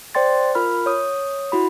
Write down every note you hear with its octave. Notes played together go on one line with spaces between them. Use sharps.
C5 D5 G5 C6 A6
F4 A#4 B5 F6
C#5 D#6
E4 F#4 B5